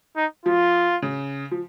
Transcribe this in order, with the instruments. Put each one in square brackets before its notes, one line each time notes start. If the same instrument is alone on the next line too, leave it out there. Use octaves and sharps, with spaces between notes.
[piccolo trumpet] D#4
[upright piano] F3 [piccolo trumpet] F4
[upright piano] C#3
F3